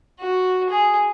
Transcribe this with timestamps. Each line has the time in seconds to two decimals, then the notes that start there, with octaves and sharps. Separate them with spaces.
0.20 F#4
0.69 G#4